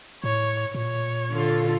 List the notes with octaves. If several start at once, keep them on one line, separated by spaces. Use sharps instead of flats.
A2 C#5
A#2 C#5
D3 F4 A4